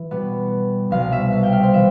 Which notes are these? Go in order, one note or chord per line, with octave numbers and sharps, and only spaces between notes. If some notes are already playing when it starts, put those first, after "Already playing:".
Already playing: E3
B2 G3 B3
C2 B2 G3 C4 F5
E5
F5
G5
F5
C5
E3 E5